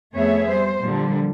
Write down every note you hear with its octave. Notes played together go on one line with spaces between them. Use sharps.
F2 A3 B3 G#4 C#5 E5
G3 C5
A#2 D3 F3 G3